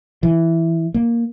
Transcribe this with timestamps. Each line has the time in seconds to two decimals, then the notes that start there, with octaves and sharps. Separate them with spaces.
0.23 E3
0.94 A#3